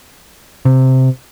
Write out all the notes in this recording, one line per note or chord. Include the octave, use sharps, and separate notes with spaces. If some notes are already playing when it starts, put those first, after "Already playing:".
C3